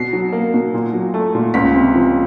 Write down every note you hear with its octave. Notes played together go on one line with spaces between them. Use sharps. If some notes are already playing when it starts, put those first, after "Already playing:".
Already playing: B2 C7
F#3
A#3
B2
A#2
F#3
A3
A#2
C#2 B6
C3
F3